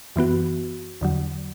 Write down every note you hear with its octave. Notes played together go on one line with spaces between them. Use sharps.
F#2 E3 B3 F#4
E2 D3 F#3